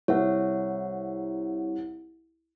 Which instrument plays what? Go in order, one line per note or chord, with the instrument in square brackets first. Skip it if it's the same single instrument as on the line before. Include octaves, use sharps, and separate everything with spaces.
[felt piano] C2 [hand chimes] C#5 E5 F#5